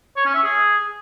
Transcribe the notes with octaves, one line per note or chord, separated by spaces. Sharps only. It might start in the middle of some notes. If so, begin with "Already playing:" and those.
C#5
C#4
E5
G#4